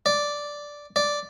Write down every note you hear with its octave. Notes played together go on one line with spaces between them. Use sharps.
D5
D5